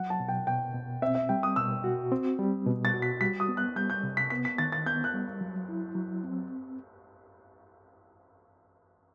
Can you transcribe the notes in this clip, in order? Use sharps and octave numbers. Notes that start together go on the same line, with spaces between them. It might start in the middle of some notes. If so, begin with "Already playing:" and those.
Already playing: F#3 F#5
A5
B2
G5
B2 G5
B2
C4 E5
E5
G3 G5
D#6
B2 E6
F#4
C4
G3
B2
A6
F#4
B6
G3 B6
D#6
B3
F#6
G3 G6
G6
C3
B6
B3 B6
B6
D#3 A6
A6
B3 G6
F#6
G3
F#3
E4
F#3
C4